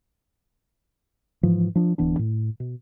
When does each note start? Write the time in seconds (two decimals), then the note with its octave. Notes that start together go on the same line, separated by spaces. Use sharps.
1.43 G#2 E3 F3
1.75 F3 D4
1.98 D1 E3 B3 D4
2.19 A2
2.60 B2